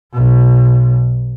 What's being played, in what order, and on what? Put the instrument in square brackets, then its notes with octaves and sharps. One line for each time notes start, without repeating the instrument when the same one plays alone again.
[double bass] B1 B2